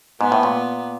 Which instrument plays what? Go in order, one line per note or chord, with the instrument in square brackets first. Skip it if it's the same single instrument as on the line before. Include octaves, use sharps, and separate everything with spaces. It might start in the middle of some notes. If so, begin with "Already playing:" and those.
[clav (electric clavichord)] G#2 [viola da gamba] B3
[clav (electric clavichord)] A2
A#2